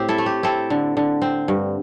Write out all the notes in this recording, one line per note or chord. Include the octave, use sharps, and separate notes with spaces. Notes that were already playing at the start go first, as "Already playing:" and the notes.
Already playing: A2 C4 G4
E4 A4
A3
G4
C4 E4 A4
D3
D3
C4
G2